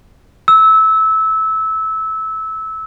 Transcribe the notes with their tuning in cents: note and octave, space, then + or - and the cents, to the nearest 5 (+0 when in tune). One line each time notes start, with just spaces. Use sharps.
E6 -20